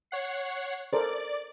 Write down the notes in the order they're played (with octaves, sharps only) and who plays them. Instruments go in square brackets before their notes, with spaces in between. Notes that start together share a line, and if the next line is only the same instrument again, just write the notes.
[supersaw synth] C#5 F#5 C7
[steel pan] A4 A#4 C5 [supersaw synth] D5